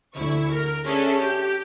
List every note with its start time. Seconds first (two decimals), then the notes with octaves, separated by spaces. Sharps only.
0.14 D2 E4 C#6
0.53 A#4
0.85 C#4 D4 G#4 A4 E5
1.19 G4